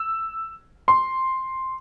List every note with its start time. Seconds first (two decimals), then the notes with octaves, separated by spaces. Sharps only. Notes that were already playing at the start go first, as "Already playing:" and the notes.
Already playing: E6
0.88 C6